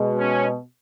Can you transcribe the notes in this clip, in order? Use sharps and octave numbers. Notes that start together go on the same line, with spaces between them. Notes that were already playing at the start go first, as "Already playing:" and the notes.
Already playing: B2 G#3
C#4